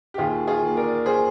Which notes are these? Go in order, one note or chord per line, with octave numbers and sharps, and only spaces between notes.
G4
D#2 F4 G#4
F4 G#4
D#3 A#3
A#4 D5
G#4 C5